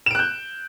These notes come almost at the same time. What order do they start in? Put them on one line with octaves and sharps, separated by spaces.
E7 D7 F#6 G6